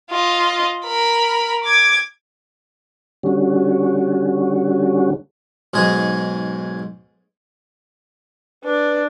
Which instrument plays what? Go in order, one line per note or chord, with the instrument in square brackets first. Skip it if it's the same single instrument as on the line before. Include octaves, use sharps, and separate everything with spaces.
[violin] F4 D#5
A#4 B5
D6 G#6
[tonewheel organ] D3 G3 C#4 F#4
[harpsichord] B1 G#2 G#3 G#4
[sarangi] D4 [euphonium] B4